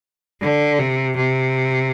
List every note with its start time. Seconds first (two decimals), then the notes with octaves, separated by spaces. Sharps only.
0.42 D3
0.79 C3
1.17 C3